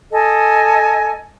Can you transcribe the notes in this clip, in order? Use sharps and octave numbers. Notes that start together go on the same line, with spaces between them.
A4 D#5 G#5